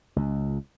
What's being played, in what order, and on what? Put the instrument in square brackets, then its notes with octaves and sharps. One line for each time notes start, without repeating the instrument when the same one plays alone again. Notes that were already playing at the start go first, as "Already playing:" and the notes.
[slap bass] C#2